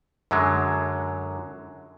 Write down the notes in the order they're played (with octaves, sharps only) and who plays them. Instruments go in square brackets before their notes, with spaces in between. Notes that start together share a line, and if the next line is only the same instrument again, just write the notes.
[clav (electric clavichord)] F#2 D3 F#3 G#3